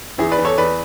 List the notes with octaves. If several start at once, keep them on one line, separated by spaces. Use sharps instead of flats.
E2 E4 G#4
B4 D5
E2
A4 C#5
E2 B4 D5